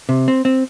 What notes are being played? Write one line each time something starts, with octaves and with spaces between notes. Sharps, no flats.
C3
C4
C4